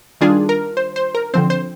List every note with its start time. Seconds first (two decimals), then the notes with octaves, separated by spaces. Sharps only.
0.21 D#3 G3 D4 F4 G#4
0.49 A#4
0.77 C5
0.96 C5
1.15 A#4
1.34 D3 F3 C4 C5
1.50 C5